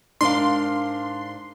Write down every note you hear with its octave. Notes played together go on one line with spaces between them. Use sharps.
G#2 D4 A#4 F5 C6